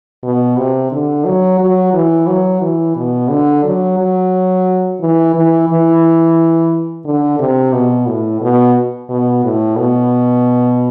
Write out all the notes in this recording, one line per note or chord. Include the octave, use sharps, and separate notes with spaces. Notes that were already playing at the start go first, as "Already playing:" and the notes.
B2
C3
D3
F#3
F#3
E3
F#3
E3
B2
D3
F#3
F#3
E3
E3
E3
D3
C3
B2
A2
B2
B2
A2
B2